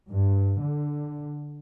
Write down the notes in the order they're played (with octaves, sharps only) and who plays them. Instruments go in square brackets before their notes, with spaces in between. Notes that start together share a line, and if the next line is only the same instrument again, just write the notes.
[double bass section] G2
D3